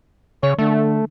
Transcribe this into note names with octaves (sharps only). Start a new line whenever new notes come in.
C#3 C#5
D3 A3